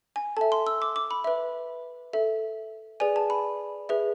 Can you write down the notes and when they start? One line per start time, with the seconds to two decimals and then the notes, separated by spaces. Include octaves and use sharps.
0.16 G#5
0.37 A4 E5 A5
0.52 C6
0.67 E6
0.82 D6
0.96 D6
1.11 B5
1.24 B4 E5
2.13 A4 E5
3.00 G#4 B4 D5 G#5
3.16 A5
3.30 B5
3.89 G#4 B4 E5